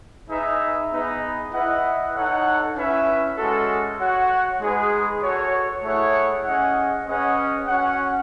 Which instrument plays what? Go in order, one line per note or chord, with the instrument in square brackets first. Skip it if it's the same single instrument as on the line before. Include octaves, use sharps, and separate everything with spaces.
[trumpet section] D#4 G#4 B4 E5
B3 D#4 G#4 B4 D#5
E4 B4 D#5 F#5
D#4 A4 C#5 F#5
C#4 E4 B4 E5
G#3 C#4 F#4 A4
F#4 C#5 F#5
G#3 D#4 G#4 B4
F#4 A4 C#5
A3 E4 G#4 C#5 F#5
C#4 G#4 D#5 F#5
C#4 G#4 B4 D#5 F#5
C#4 F#4 C#5 F#5